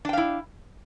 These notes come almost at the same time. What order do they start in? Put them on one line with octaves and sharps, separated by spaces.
D4 G5 F5 E4